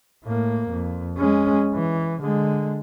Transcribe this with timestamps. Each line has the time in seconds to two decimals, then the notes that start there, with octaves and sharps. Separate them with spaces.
0.24 A2 A#3
0.69 F2
1.17 G#3 C#4
1.74 E3
2.22 D3 G#3